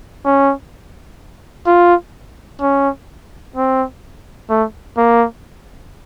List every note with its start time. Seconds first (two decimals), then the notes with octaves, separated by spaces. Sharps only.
0.25 C#4
1.67 F4
2.61 C#4
3.56 C4
4.50 A3
4.97 A#3